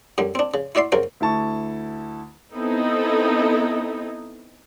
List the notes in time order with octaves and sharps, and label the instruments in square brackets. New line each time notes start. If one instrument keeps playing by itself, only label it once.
[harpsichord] F#2 D3 G3
C4 D4
C#3
E4 F#4 D5 E5 C6
F#2 C#3 F#4 A#4 C5
[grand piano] D2 E4 A5 C#6
[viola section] B3 C4 D#4 E4 A4 D#5